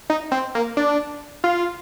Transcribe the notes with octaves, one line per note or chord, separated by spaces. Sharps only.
D#4
C4
A#3
D4
F4